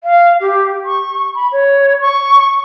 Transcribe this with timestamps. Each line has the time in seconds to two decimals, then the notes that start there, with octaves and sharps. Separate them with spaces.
0.04 F5
0.41 G4
0.85 C#6
1.35 B5
1.52 C#5
2.01 C#6